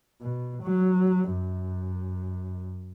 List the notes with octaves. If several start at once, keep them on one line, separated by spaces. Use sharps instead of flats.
B2
F#3
F#2